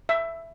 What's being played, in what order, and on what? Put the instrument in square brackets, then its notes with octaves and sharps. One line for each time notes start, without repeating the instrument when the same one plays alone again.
[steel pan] E5